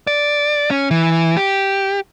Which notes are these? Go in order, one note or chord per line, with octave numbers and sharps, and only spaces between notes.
D5
C#4
E3
G4